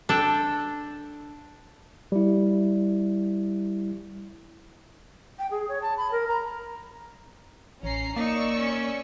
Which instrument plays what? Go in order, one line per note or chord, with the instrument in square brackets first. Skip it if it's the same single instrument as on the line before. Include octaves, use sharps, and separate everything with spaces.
[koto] D4 A4 G5
[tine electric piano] G3 E4
[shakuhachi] G5
G#4
C#5
A5
B5
A#4
A#5
[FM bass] A1 [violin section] C#4 A#5 C7
[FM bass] A#3 [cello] D#4 [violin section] D5 C#6 E6
[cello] C#4